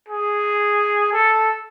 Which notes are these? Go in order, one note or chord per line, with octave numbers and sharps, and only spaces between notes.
G#4
A4